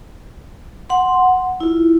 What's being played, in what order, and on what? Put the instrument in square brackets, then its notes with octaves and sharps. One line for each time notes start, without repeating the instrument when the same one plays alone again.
[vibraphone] F#5 C6
E4 F4